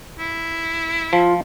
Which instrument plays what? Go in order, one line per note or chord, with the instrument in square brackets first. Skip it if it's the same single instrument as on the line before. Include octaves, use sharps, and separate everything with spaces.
[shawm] E4
[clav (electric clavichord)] F3 [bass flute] F4